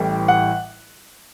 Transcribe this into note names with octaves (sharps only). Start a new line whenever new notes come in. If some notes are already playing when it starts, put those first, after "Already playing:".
Already playing: A1 A2 E3 G3
F#5